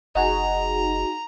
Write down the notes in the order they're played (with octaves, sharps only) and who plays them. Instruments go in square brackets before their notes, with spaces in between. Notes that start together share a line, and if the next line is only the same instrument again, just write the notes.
[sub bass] F#1 [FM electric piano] D#4 F#4 G#4 [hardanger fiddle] A#5